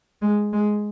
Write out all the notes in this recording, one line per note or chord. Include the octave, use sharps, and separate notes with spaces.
G#3
G#3